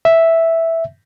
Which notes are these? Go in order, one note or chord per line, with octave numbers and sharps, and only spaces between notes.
E5